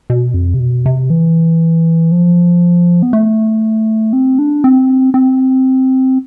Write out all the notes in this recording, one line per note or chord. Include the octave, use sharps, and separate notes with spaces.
B2
F2
C3
B2
C3
E3
F3
B3
A3
C4
D4
C4
C4